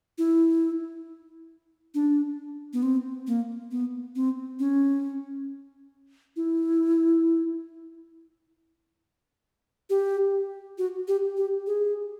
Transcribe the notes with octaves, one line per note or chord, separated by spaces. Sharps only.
E4
D4
B3
C4
A#3
B3
C4
C#4
E4
G4
F#4
G4
G4
G#4